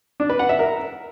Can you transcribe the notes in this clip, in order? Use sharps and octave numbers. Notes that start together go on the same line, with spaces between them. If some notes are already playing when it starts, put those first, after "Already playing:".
D4
B4
F#5
E5
A#4